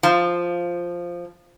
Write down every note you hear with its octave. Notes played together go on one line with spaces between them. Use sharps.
F3